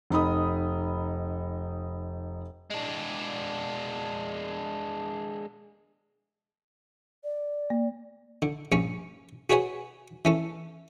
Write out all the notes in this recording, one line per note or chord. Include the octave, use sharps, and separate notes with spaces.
F1 D#4 B5 D#6
G#3 D4
D5
A#3
D3
A#1 G2 C#4 C#6
F#4 G#4 B4 C#5 F#5 G#5
E3 C#4 A4